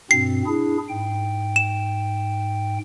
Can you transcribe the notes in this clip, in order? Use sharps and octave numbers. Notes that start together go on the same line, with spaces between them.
G2 B2 C4 C7
D4 E4 G#4
G#2 G5
E7